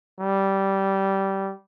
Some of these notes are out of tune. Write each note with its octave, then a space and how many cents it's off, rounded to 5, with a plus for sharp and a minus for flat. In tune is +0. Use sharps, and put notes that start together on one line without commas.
G3 -15